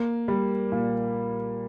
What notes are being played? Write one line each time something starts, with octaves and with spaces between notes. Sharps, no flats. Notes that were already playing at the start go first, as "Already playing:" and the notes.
Already playing: A#3
G3
A#2